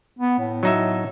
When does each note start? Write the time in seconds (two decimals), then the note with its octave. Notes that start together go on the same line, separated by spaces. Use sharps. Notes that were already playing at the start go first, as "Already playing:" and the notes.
0.19 B3
0.39 A2
0.63 F#3 D#4 E5